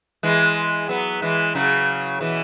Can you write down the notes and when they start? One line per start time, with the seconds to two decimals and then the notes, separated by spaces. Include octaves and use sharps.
0.23 E3 G#3
0.89 F#3 B3
1.22 E3 G#3
1.55 C#3 F#3
2.21 B2 E3